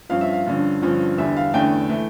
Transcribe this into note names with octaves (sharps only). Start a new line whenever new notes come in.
G2 F3 C#4 F5
E5
F5
G2 D3 F3 C#4
G2 D3 F3 C#4
E2 D3 G3 E5
F5
E2 D3 A3 C#4 G5
E3 A3